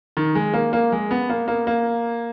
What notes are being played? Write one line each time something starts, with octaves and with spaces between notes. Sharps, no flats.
D#3
G#3
A#3
A#3
G#3
B3
A#3
A#3
A#3